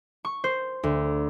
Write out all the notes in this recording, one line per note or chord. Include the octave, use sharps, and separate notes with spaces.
C#6
C5
D2